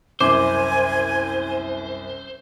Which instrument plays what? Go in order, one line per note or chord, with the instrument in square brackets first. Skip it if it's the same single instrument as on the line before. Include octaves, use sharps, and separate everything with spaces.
[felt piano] C2 F#2 [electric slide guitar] C5 [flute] G#5 [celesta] D6